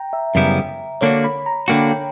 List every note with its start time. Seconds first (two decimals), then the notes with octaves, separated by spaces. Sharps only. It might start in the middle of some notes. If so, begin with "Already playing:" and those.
Already playing: G5 A#5
0.13 E5
0.35 F#2 C#3 G3 B3 E4
1.01 D3 A#3 D4 F#4 C#5
1.24 B5
1.46 A#5
1.68 D3 A#3 D4 F#4 G5
1.91 G5